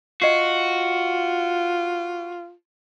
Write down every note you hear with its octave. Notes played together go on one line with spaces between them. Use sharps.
F4 F#4 D#5 C7